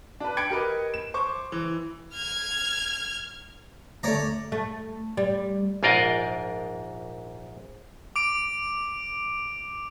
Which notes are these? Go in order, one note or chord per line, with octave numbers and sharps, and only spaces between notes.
D4 B4
G5 B5 D6 G#6 C#7 D7
G4 A#4 B4 D#5
E7
C5 C#6 D6
E3
F6 G#6
D2 A3 C#5 D5 A#5
A3
G3
A#1 G#2 F4 A#4 D5 D#5
D6 D7